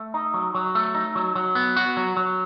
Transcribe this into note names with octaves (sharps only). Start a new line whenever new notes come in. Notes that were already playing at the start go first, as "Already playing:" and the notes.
Already playing: A3
D#4
F#3
F#3
A3
D#4
F#3
F#3
B3
F#4
F#3
F#3